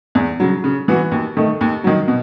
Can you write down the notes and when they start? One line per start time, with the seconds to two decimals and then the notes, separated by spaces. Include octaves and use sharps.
0.15 E2
0.40 C#3 F#3
0.64 C#3
0.88 E3 B3 F#4
1.11 D#2
1.37 D#3 A3
1.61 D#2
1.84 D#3 F#3
2.08 B2